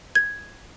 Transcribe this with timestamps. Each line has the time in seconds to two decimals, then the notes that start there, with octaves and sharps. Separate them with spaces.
0.15 G#6